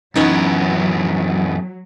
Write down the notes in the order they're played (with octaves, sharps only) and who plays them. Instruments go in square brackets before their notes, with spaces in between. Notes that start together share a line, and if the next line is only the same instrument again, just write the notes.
[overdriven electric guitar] F#2 E3 [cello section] F#3 [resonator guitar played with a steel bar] B3 C#4 D#4